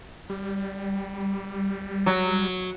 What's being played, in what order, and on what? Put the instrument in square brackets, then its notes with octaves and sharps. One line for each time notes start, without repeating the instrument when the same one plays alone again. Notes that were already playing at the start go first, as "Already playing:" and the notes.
[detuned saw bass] G3
[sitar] F#3